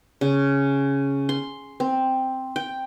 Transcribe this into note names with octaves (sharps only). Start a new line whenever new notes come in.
C#3
C6
C4
G5